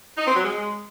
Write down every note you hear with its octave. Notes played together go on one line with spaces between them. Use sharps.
D#4
C4
F#3
G#3